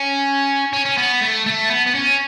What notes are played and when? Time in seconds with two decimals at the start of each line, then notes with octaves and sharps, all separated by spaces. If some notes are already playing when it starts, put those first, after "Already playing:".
Already playing: C#4
0.73 C#4
0.85 C#4
0.97 B3
1.21 A3
1.46 A3
1.70 B3
1.86 B3
1.95 C#4